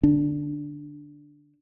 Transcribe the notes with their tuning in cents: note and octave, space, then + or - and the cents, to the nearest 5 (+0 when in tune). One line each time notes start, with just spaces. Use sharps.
D3 +0 D4 +0